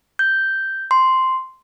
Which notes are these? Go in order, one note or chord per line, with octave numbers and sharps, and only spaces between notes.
G6
C6